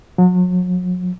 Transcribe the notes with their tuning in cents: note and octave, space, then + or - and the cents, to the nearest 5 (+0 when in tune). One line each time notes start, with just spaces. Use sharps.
F#3 -40